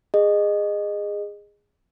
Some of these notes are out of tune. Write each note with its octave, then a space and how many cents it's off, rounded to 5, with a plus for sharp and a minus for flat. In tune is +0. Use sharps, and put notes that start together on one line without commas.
G#4 -15 D#5 -20